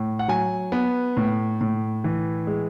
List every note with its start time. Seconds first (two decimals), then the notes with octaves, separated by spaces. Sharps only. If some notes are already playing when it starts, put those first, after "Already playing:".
Already playing: A2
0.19 F#5
0.28 F#3 G#5
0.72 B3
1.17 A2
1.61 A2
2.04 E3
2.47 G#3